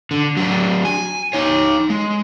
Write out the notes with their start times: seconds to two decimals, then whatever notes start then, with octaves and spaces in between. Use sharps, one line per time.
0.11 D3
0.37 F#3 D4
0.85 G#5
1.33 D#4 C#5
1.90 G#3